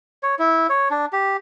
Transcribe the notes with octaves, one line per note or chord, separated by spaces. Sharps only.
C#5
E4
C#5
D4
G4